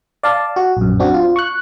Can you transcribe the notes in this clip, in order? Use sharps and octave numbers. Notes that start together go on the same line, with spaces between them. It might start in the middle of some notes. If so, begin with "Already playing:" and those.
D5 F5 A5
F#4
A#1 F#2
C4 D4 F#4
F4
C#6 F#6